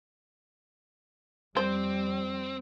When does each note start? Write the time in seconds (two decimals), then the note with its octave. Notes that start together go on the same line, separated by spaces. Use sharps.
1.57 F2 G3 C4 C5